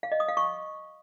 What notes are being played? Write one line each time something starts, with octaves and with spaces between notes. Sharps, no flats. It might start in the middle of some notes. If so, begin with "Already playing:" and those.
F5
D#5
D#6
F5
C#6